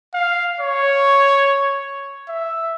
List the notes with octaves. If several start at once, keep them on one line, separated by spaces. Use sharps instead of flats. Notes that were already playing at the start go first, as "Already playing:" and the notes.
F5
C#5
E5